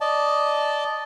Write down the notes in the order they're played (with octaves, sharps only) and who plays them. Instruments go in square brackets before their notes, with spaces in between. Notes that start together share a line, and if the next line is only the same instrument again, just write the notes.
[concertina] D5 D#5 A5